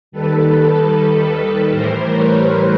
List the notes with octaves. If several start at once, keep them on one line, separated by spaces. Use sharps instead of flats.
D#2 D#3 G3 A4 B4
A2 E3 G3 A#4 C5
B4 C#5